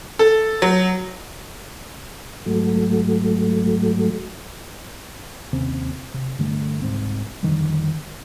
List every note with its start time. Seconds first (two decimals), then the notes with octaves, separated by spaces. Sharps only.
0.19 A4
0.62 F#3
2.46 G#2 F#3 A3
5.53 D#2 C3 C4 C#4
6.14 C3
6.39 G2 D3 A3
6.82 C2 G#2 C4
7.43 F2 D3 D#3 G3